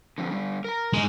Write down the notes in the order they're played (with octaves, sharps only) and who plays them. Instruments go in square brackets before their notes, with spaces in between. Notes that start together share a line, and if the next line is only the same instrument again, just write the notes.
[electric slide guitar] D3 F3 C4
D3 G3
A#4 A#5
[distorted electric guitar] G#3 D#4